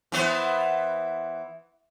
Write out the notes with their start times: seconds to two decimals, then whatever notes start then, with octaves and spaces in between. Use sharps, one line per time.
0.12 E3 B3 C5